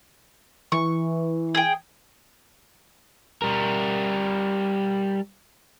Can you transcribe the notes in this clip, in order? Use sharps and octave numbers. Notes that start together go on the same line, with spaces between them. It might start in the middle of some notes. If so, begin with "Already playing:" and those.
E3 C#6
G#4 G5
G3 A#4